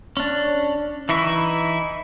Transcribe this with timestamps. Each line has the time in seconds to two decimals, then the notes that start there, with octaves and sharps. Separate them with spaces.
0.17 C#4 D4
1.09 E3 D#4 E4 C#6